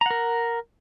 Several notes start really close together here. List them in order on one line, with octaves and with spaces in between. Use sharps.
A#5 F#5 A#4